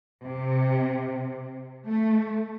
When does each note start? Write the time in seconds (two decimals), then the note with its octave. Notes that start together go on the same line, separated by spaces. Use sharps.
0.24 C3
1.86 A3